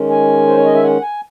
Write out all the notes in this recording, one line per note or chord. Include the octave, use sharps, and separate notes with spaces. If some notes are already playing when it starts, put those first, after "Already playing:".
Already playing: D#3 G#3 C#4
G#5
C5
C#5
D#5
E5
F#5
G#5